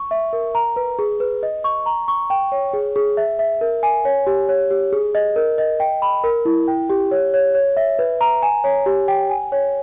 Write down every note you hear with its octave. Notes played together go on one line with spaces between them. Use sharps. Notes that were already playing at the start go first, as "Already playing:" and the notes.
Already playing: C#6
E5
A#4
A#5
B4
G#4
B4
D#5
C#6
A#5
C#6
G5
C#5
G#4
G#4
E5
E5
A#4
G#5
C#5
G4
C#5
G4
G#4
D#5
A#4
D#5
G5
B5
A#4
E4
G5
G4
C#5
C#5
C#5
E5
B4
A#5
G#5
C#5
G4
G5
G#5
C#5